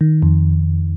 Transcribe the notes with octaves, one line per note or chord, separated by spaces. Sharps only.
D#3
F2